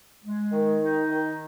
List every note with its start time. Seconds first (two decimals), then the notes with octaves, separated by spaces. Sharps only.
0.24 G#3
0.52 D#3
0.81 D#4
1.10 D#3